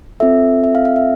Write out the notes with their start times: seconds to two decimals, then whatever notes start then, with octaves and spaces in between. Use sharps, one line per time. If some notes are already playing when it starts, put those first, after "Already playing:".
0.20 C4 F4 A4 E5
0.64 E5
0.75 F5
0.85 F5
0.96 E5